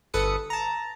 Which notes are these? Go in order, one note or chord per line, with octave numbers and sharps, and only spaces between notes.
G1 A4 B4 D#6 C#7
A5 A#5